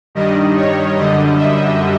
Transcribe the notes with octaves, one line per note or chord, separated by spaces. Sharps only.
G2 D#3 G3 D#5
C#5
F#2 D3 G3 D#5
E5